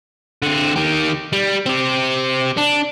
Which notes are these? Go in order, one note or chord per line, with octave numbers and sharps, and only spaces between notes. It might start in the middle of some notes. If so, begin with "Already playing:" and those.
D3 C4
D#3 G4
G3
C4 G4
D4